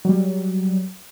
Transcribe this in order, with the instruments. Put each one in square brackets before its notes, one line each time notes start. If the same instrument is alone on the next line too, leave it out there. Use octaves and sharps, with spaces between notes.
[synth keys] F#3 G3